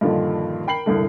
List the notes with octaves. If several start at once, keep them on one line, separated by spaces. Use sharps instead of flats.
G2 A#2 D3 D#3 F3
A#4 G5 B5 C7 F#7
E1 C2 G2 D3